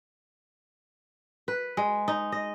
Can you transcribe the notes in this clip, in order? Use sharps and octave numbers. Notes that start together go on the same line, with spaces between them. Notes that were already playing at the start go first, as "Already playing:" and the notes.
B4
G#3
D#4
D#5